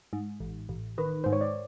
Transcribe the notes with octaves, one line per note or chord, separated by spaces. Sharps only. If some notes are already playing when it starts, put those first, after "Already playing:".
G#2
A1
A1
D#3 B4
G#2 C5
C#5
D5